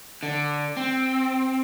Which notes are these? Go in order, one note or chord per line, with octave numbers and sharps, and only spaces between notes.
D3
C4